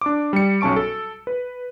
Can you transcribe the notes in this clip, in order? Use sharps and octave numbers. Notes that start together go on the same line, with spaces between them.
D4 D6
G3 C#7
B1 C#4 A5 C#6 D7
A4
B4